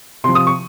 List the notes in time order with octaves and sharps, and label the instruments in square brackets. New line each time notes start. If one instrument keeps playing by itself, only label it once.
[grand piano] C3 F3 C6
D#6
C#6